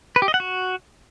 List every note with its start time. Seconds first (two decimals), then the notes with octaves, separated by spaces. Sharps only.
0.16 B4
0.22 G4
0.28 D#5
0.34 F#5
0.40 F#4